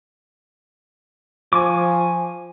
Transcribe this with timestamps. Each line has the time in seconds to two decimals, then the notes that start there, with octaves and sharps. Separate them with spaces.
1.53 F3 G#5 C#6 D6